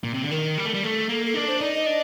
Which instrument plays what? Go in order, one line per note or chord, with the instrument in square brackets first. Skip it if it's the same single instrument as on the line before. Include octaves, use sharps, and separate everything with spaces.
[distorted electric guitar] A#2
C3
D3
[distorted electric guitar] D#3 [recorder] A#4
[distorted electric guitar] G3
A3
G3
[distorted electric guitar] A3 [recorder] A4
[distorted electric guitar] A#3 [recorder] A4
[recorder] A4
[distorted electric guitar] D4 [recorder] A#4
[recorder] C5
[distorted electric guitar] D#4 [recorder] D5
[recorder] D#5
[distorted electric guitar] D4